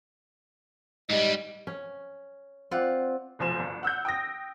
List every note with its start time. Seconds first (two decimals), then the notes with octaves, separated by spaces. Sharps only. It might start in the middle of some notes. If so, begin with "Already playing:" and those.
1.10 G#2 G3 D#5
1.67 C#4
2.71 C4 F4 D5 F#5
3.39 F1 B1 F3 C5 G#5 E7
3.59 G1
3.83 F#5 E6 F#6 G6
4.05 G5 D#6 A#6